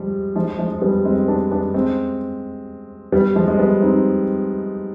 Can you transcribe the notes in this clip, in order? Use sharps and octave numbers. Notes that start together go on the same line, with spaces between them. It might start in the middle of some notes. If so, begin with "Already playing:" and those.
Already playing: F3 G3 G#3
F3 G#3
F3 G#3
G3 B3
G#3 C4
B3 D4
B3 D4
G#3 C4
G3 B3
F3 G#3
G#3
G3 B3
C4 D#4